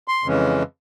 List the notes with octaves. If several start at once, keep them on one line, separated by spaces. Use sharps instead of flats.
C6
F2 C#3 E3 G#3 C#4